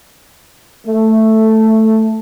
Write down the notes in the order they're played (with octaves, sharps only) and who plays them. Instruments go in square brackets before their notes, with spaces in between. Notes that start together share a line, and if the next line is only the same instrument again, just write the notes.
[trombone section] A3